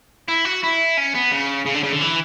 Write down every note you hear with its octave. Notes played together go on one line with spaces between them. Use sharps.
E4
F#4
E4
C#4
B3
C#3
C#3
D3
C#3
D3
E3